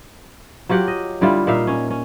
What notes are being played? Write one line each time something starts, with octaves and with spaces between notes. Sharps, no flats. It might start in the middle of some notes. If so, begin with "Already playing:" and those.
F#3 F4 G4 F#5
D#5
D3 G3 E4 F4
A#2 D#4 E5 F5
C#4
C#4